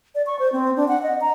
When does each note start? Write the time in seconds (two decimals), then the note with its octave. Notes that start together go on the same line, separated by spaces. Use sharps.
0.15 D5
0.26 C#6
0.39 C5
0.52 C4
0.77 D4
0.88 F#5
1.03 D#5
1.21 A#5